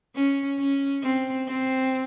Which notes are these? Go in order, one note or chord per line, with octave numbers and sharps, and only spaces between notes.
C#4
C#4
C4
C4